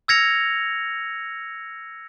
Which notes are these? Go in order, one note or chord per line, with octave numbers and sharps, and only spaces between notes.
E6 F6 G#6 A#6 C#7 F7